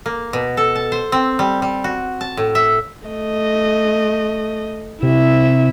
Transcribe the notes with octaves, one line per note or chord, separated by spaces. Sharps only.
A#3
B2
A4
A5
C5
C4
G3
G3
F#4
A5
A2
E5
A3 D#5
C3 E4 E5